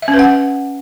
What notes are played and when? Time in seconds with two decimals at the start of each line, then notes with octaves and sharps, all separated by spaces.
0.02 E5
0.08 C#4
0.13 B4
0.19 F#5